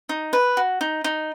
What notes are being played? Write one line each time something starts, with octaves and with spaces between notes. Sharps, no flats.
D#4
B4
F#4
D#4
D#4